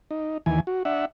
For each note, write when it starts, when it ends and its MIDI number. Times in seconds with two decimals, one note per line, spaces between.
0.11 0.38 63
0.46 0.60 39
0.46 0.60 52
0.46 0.60 80
0.67 0.83 66
0.85 1.05 62
0.85 1.05 76
0.85 1.05 78